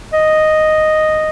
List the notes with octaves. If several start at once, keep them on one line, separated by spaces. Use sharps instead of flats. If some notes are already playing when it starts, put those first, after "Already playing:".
D#5